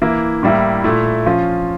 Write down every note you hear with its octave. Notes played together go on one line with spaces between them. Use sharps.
E3 A#3 E4
A2 G3 A#3 E4
A#2 A3 E4
F3 C#4 F4